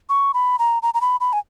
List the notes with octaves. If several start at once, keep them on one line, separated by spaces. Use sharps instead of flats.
C#6
B5
A#5
A#5
A#5
B5
B5
G#5